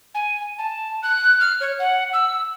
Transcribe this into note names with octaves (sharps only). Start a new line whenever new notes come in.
G#5
A5
F#6
F6
C#5
F#5
E6